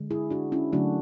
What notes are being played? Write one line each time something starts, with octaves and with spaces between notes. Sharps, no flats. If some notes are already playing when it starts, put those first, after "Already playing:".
Already playing: D3 G#3
E4 G#4
D4 F#4
C#4 E4
D3 F#3 A3 D4 F#4